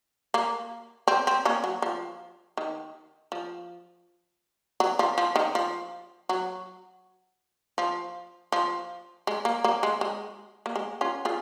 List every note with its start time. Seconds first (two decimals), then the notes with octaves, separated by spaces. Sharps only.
0.34 A#3
1.08 C4
1.27 C4
1.45 A#3 C#4
1.64 F#3
1.82 F3
2.57 D#3
3.32 F3
4.80 F#3
4.99 F3
5.18 F3
5.36 D#3
5.55 F3
6.29 F#3
7.78 F3
8.52 F3
9.27 G#3
9.45 A#3
9.64 A#3
9.83 G#3
10.01 G#3
10.66 A#3
10.76 G#3
11.01 C#4 F4
11.25 F4 G#4